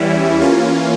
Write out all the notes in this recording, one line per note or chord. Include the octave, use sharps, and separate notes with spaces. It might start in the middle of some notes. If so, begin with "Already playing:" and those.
Already playing: E2 E3 G3 C#4 E4
E3 A#3 C#4 F4